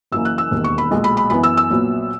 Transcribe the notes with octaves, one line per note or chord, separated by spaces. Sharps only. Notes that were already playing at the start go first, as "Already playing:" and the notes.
F#1 F#2 E3 A#3 E6
F#6
E6
E1 D#2 D#3
C#6
B5
B1 A#2 G#3
B5
B5
F#2 E3 B3 B5
E6
E6
A#1 A#2 F#3 B3